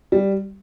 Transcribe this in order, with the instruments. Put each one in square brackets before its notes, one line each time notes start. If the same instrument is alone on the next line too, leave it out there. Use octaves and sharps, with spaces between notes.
[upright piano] G3